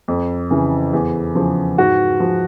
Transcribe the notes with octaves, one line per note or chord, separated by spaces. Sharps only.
F2
C#3 E3
E2
C#3 F3
G#2 F#4
F3